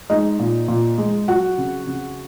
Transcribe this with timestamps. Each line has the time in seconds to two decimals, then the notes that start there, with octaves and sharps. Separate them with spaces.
0.10 G#3 D#4 D#5
0.39 A#2
0.68 A#2
0.98 G#3
1.28 F#3 F#4 F#5
1.58 C#3
1.87 C#3